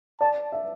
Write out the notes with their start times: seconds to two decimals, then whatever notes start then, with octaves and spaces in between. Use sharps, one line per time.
0.21 D5 A5
0.52 E5